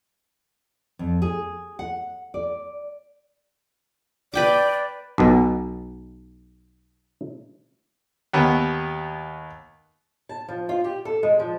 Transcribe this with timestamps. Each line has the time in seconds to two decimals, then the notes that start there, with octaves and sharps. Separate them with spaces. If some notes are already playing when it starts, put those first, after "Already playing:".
0.99 F2
1.22 G#4
1.79 F#5
2.34 D5
4.34 B4 D5 G5 D6
5.18 B1 B2
8.33 D#2 B3
10.29 A5
10.49 F3
10.69 F4
10.84 G4
11.05 A4
11.23 G#3
11.39 F3